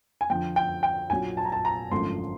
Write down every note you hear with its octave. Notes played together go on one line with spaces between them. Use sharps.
G#5
F2 D3 F3 G5
G5
G5
A#1 A#2 F#3 G#5
A5
A#5
A5
A#5
G#1 F#2 D3 F3 A3 C6